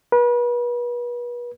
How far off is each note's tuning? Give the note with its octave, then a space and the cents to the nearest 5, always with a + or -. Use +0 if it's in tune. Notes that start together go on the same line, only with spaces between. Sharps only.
B4 -35